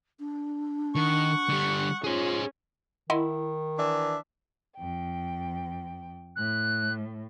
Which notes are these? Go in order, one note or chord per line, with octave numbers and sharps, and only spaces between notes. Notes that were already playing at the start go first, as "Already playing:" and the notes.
D4
D#3 F#5 C#6
D3 G3
C#4 F4 G#4 C5
D#3 E4 D#5 F#5 C6
E3 D4 E5
F2 G5
A2 F#6